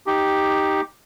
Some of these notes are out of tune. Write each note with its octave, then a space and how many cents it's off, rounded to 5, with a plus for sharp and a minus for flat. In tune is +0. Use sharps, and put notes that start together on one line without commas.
D#4 +0 G4 +0